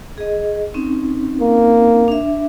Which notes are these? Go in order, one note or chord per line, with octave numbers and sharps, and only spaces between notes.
G#4 D#5
C4 C#4 D#4
A#3
D4 E5